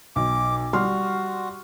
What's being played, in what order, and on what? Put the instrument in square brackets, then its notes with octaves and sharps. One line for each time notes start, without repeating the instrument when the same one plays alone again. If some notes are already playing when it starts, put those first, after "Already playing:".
[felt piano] B1 [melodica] D6
[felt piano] G3 C6 F6 [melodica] F#4